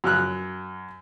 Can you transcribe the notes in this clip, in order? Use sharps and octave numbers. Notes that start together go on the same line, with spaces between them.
F#2 F6 F#6